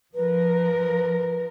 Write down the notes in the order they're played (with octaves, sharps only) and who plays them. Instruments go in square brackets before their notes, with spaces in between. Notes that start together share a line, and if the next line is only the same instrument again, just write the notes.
[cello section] F3 A#4 [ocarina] B4